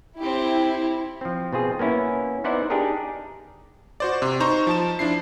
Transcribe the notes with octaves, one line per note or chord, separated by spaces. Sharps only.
C4 E4 G4
F3 C4
B2 C4 F4 G#4
A#3 B3 C#4 E4
B3 D#4 E4 C5 D5 F#5
D4 D#4 G4 G#4 A#4
F#4 C5 D5
C3 C6
D#4 C5 A#5 C#6
F3 A5 E7
F3 D4 E4 C7